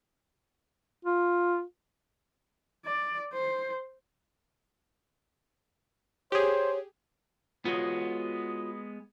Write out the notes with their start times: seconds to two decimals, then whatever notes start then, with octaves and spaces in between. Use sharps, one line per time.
1.05 F4
2.86 D5
3.33 C5
6.32 G4 G#4 C5 C#5
7.65 G#3 B3 F4 F#4 C#5